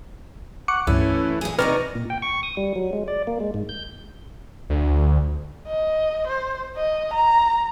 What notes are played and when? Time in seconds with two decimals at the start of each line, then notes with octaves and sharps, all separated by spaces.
0.68 F#5 C#6 D6 C#7
0.87 C#2 G2 E3 A3 C#4
1.41 A#2 G#4
1.59 C3 E3 D#4 B4 D5 A#5 C#6 F6
1.95 A#2
2.10 G5
2.22 C#6
2.43 D#6
2.57 G3
2.76 F#3
2.93 G#3
3.08 D5
3.27 A#3
3.40 G#3
3.54 G#2
3.69 G6
4.70 D2
5.67 D#5
6.27 C5
6.76 D#5
7.13 A#5